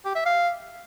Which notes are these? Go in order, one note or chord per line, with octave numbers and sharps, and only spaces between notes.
G4
E5
F5